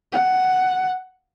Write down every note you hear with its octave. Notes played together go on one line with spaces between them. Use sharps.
F#5